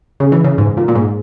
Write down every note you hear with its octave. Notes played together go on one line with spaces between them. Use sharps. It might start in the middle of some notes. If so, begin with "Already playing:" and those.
C#3
E3
C#3
G#2
A#2
A#2
G#2